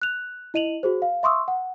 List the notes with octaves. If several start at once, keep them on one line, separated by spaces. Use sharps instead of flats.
F#6 F7
E4 D#5 D#7 F7 F#7
F#4 G#4 C5
F5
E5 C6 C#6 D#6 E6
F#5